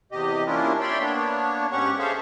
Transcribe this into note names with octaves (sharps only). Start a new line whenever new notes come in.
E2 C3 G4 D#5
A#3 C#4 D4 E4 F4 A#4
C#5 D5 E5 G5 B5 C6
A#3 B3 D4 C#5
G#2 C#4 G4 C#5 F#5 C#6
G#4 A4 C5 C#5 E5 F5